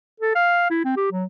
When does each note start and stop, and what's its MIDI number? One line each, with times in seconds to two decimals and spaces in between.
0.20 0.35 69
0.35 0.67 77
0.70 0.80 64
0.85 0.94 60
0.96 1.07 67
1.12 1.24 54